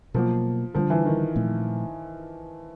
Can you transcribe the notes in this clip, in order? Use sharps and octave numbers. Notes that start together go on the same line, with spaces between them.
B2 F3 F#3 A#3
D3 F3 G3 B3 D4
E3
D#3
A#2 F3 A3 C4